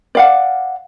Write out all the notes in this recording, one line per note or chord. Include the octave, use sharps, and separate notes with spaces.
D5 F5 F#5